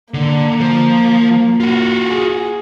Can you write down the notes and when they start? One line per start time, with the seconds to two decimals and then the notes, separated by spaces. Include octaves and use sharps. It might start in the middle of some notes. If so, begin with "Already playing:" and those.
0.14 D3 A#3
0.60 F3
1.60 F4 F#4
2.09 G#4